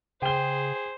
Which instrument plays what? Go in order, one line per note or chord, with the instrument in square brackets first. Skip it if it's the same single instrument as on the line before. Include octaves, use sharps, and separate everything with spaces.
[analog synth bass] C#3 [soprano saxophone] G#4 [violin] C5 [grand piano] G5 G7